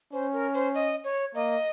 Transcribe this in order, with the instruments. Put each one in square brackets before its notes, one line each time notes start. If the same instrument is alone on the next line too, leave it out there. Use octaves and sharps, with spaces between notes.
[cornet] C#4 [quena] C5
[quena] A#4
C5
D#5
C#5
[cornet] A#3 [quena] D#5